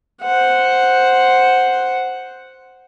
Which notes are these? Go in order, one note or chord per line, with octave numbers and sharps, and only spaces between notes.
C5 F#5